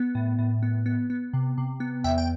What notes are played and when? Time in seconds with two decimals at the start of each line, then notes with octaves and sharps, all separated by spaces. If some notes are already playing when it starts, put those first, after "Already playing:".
Already playing: B3
0.15 A2
0.39 A2
0.63 B3
0.86 B3
1.10 B3
1.33 C3
1.58 C3
1.80 B3
2.04 E2 E5 G5
2.18 G5